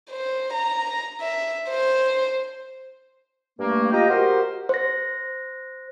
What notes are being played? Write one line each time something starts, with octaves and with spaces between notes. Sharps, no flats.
C5
A#5
E5
C5
G2 A3 A#3
F4 G4 D#5 G5 A#5
F#4 G4 A#4 C5
C5 A#6